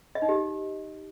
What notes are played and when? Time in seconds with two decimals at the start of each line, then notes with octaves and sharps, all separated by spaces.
0.15 D#5
0.22 D#4
0.29 G4